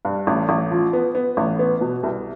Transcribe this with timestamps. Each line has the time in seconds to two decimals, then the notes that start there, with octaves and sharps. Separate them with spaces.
0.05 G2
0.27 A1
0.49 A1
0.71 F3
0.93 B3
1.15 B3
1.37 A1
1.59 B3
1.81 B2
2.03 C2